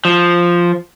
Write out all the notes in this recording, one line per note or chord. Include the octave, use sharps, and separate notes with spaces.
F3